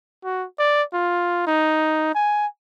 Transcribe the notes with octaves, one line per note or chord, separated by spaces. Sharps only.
F#4
D5
F4
D#4
G#5